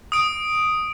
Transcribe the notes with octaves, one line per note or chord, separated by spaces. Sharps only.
D#6 D7